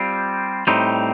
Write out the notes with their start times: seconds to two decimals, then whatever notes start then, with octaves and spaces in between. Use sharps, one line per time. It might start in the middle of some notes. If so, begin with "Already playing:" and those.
Already playing: G3 C4 F4
0.67 A2 G3 C4 D#4